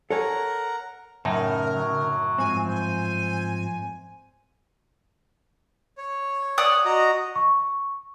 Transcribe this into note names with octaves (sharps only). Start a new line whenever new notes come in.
A4 A#4 C#5 F#5 G#5 A#5
F#2 A2 C#3 D#4 A#4
F#3
G#2 F3 C4 G#5
C5 G#5
C#5
D5 F#5 D#6
F#4 D#5 A#5
C#6